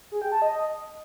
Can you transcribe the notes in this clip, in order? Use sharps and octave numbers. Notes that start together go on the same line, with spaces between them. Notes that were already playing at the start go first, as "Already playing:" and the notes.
G#4
G5
A5
D#5
D#5